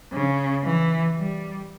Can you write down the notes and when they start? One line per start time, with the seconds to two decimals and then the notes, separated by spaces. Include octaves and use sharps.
0.13 C#3
0.64 E3
1.16 G3